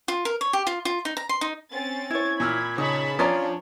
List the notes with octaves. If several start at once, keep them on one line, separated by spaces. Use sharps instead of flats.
F4
A#4
C#5
G4
F4
F4
D#4
A#5
C6
D#4
C4 C#4 A6
E4 C#5 G#6
A#2 B5 E6 F6
C#3 D#4 C#5 A5 B5
F3 C#4 D4 C#5 D5 A#5 C6 D#6